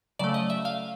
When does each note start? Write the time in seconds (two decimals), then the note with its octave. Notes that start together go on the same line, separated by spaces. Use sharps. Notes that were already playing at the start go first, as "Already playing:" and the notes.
0.19 C#3 F#3 A3 D5
0.34 D#5
0.50 E5
0.65 F5